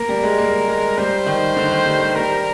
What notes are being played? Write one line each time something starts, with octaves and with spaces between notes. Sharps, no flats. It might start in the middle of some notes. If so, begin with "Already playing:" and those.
Already playing: A#3 A#4
G3
G#3
A#3
G#3
G3 C5
D#3
D3
D#3
G3
G3
G3 A#4